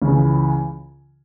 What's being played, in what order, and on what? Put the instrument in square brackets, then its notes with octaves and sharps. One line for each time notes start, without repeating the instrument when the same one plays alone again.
[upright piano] C#2 C#3 E3